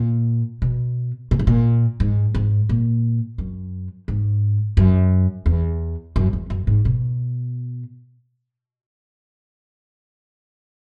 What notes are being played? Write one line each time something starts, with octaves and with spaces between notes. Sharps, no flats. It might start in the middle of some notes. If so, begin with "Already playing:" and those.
Already playing: A#2
B2
A#2
G#2
A#2
G#2
G#2
A#2
F#2
G#2
F#2
E2
F#2
E2
F#2
G#2
B2